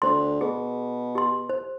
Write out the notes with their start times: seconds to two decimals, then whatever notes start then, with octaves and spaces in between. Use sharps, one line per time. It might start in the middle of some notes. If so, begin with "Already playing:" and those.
0.02 D2 C5 C6
0.41 B2 G#4
1.15 G4 C6
1.50 C5